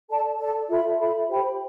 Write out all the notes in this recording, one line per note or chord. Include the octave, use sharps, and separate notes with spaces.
A4 D5 A5
A4 D5 A5
F4 A4 E5 B5
F4 A4 E5 B5
G4 C5 G5 B5